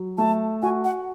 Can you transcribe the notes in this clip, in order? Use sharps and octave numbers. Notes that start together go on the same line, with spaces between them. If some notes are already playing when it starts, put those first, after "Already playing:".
Already playing: F#3
A3 A5
F#4 G#5
F#5